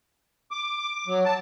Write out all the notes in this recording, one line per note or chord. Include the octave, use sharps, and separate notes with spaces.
D6
F#3
A5